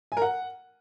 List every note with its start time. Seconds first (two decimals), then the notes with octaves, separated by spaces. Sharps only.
0.12 G#5
0.17 A#4
0.22 F#5